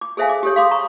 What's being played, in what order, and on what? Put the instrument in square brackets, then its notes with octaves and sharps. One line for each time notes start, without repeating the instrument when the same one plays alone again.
[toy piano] D6
G#4 A4 C5 E5 F5 G#5
D6
G4 A4 C#5
F5 C6 D6 D#6
A#5 C#6